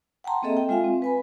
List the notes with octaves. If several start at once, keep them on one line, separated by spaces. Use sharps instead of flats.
F#5 G5 A5 A#5 C6
A#3 C4 G#4 A4 D#5 E5
G5
G#3 F4 E5 F5 G#5
C4
B4 G#5 B5